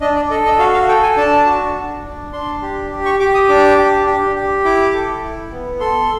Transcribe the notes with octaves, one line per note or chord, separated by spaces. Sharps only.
D4 D#5
D5
A4 D#5
D#5
F#4 F5
F5
A4 G5
G#5
D4 A5
F#4
D4
D4
D4 C6
G4
G4
C#6
G4 D6
D#6
D4 D6
G4
G4
G4
E4 D6
A4
E4
B3
A4 C6